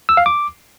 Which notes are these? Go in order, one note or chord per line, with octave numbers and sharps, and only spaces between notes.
E6
F5
D6